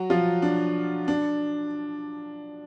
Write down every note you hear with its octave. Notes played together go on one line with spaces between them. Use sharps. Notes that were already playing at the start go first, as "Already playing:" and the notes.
Already playing: F#3 F#4
F3 F4
D4
D4